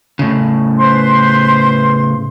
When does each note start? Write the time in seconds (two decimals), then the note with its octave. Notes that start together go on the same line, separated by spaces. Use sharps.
0.19 A2 C#3
0.79 B4 C5 C6